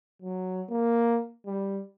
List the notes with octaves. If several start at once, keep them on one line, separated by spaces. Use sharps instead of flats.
F#3
A#3
G3